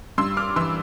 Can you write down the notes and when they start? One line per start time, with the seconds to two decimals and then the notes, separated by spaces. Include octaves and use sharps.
0.18 G2 C6 E6
0.37 D6 F6
0.56 E3 C6 E6